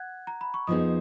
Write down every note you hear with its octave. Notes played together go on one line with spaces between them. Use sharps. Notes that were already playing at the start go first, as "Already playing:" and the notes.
Already playing: F#5 F#6 G#6
A#5
B5
C#6
F2 F3 B3 D#4 G#4 D#5 D#6